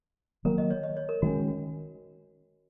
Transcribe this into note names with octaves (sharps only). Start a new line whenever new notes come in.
D#3 F#3 A#3 A#4
D#5
C#5
D#5
C#5
A#4
D#3 G#3 C#4 F#4